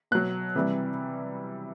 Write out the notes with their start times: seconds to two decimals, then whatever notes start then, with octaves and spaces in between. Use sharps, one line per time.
0.11 B2 F#3 F#6
0.55 C3 E3 G3